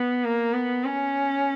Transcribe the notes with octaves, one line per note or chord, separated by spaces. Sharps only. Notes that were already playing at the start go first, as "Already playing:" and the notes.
Already playing: B3
A#3
B3
C#4